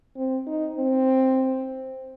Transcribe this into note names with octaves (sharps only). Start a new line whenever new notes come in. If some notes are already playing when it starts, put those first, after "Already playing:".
C4
D#4
C4